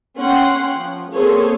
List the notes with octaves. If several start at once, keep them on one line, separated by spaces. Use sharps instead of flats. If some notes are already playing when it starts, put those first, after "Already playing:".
C#4 C#5 F#5 G5 C6
F3
A#3 C4 G#4 A4 C5 C#5